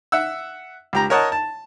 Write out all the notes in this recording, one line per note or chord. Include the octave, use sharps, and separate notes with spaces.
E5 F#5 E6
C#2 G4 A#5
A#4 C#5 D#5 F#5 A5
A5